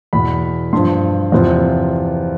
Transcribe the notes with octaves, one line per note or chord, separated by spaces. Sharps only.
E2 B2 B5
G2 F3 C6
E2 C3 F3